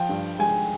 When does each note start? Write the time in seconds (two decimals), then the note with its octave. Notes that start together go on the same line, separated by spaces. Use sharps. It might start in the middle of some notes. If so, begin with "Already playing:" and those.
Already playing: F3 G5
0.09 G2
0.39 G#3 G#5